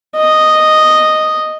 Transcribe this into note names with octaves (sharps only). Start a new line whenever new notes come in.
D#5